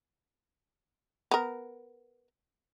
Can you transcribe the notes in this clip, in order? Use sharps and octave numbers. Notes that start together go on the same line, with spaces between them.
B3 A#4